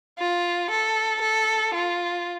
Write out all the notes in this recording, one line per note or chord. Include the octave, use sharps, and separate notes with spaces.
F4
A4
A4
F4